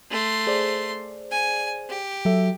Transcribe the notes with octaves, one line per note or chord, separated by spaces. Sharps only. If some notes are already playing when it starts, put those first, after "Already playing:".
A3 C6
G#4 C5 D5
G#5
G4
F#3 A4 E5